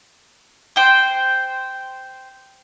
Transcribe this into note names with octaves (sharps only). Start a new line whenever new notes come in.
C5 G5